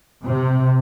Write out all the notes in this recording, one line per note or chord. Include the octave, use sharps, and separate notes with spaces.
C3